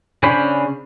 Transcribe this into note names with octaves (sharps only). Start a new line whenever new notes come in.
C#3 C#4 D4 C5 B5